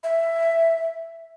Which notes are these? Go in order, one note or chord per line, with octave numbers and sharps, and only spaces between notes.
E5